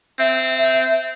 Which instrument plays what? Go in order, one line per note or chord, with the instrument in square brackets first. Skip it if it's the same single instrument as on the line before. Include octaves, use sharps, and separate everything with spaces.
[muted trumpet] C4 [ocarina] E5